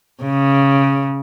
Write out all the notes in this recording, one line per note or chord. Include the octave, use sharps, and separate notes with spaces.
C#3